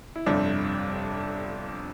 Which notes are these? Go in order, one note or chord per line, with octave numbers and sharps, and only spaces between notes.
E4
G1 F2 C3 G3 D4